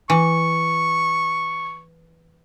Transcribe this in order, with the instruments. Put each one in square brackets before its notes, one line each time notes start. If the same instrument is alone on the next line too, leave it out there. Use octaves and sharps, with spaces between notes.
[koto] E3 [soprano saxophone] C#6